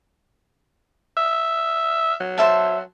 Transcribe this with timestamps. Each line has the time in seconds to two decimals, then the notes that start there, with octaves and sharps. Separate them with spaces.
1.17 E5
2.20 F#3
2.38 C5 E5 A5